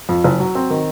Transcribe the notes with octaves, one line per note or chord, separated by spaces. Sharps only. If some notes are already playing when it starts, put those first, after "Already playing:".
F2
F#1
F#3
C4
D#3